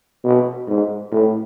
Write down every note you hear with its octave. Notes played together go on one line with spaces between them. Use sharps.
B2
G#2
A2